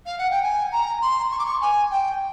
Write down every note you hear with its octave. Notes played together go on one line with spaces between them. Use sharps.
F5
F#5
G5
G#5
A#5
C6
C#6
D6
C#6
G#5
G5